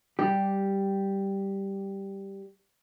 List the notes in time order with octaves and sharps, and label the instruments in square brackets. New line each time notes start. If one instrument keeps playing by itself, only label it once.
[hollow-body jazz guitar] G3 G4